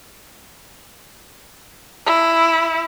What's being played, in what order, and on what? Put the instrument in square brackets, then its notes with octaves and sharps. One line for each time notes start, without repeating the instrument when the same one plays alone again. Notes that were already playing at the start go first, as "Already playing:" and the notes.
[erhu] E4